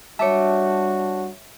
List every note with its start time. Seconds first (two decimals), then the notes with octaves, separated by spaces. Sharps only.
0.19 G3 D4 F#4 C#5 E5 A5 D6 C#7